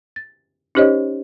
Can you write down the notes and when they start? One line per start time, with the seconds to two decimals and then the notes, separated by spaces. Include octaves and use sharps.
0.16 A6
0.75 C#4 D#4 G4 C5 C#5 D#5